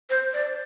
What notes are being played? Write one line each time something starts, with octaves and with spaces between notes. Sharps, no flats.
C5
D5